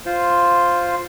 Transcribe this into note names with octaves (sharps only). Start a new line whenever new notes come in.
F4 C5